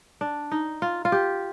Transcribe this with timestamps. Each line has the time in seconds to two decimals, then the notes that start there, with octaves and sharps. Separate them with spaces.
0.21 D4
0.51 D#4
0.82 F4
1.05 F4
1.12 G4